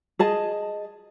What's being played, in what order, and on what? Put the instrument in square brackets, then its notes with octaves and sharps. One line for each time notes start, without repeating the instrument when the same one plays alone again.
[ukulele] G#4 D#5 A5